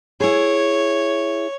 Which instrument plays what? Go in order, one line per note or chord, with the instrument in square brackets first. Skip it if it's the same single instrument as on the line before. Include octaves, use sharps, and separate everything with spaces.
[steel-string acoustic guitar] E4 G#4 [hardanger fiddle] C#5